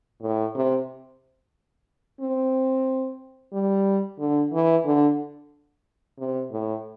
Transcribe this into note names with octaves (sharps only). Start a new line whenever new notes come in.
A2
C3
C4
G3
D3
E3
D3
C3
A2